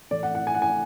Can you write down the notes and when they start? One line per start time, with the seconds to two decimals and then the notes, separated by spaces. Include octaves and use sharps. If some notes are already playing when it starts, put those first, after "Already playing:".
0.11 A2 E3 A3 D5
0.23 F#5
0.35 F#5
0.47 G#5
0.55 F#5
0.62 G#5